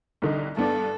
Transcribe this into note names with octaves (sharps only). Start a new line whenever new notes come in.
C2 D3 D#4
G2 B3 D4 A4